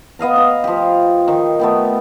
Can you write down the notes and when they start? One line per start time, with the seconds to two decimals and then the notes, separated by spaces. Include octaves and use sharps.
0.19 B3 D#5 F5 A#5
0.36 F5 A#5
0.64 F3 G4
1.28 D#3
1.60 A3 B3 G5